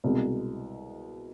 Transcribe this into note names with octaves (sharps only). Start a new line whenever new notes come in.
C2 B2 G#3